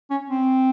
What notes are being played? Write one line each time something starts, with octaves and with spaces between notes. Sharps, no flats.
C#4
C4